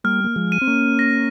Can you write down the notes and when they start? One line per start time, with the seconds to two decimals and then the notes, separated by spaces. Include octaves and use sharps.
0.04 G3 A#3 F6
0.24 A#3
0.36 F3 G#3
0.52 D#7
0.62 C4
0.67 A#3 C#4
0.99 A#6